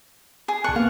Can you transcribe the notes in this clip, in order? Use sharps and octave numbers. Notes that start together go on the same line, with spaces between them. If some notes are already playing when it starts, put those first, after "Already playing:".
G#4
C2 A5 C#6 F#6
A#3 B3 F5